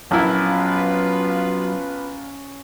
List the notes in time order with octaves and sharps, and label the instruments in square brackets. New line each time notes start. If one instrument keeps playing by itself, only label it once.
[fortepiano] A#1 E4 [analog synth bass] F#3 [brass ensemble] B3 F4 B4 [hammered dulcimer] C#4